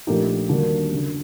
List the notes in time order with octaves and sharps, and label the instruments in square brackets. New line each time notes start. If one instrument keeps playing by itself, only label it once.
[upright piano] A#1 A#2 A3 D#4 G4
D#2 D3 G3 A#3 D4 F#4
F#1 F#2 D3